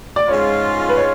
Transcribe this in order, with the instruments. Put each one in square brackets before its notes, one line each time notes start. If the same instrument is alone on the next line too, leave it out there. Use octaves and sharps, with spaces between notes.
[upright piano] D5
[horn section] G#2 G#3 C#4 F4 [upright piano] C#5
[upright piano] B4
C#5